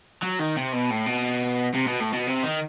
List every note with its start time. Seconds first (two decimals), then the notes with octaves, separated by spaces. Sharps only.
0.22 F#3
0.39 D#3
0.57 C3
0.73 B2
0.91 A2
1.07 B2
1.75 C3
1.87 B2
2.00 A2
2.13 B2
2.27 C3
2.43 D#3